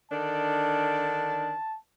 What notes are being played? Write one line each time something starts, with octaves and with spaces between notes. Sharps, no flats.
D3 D#3 D4 A5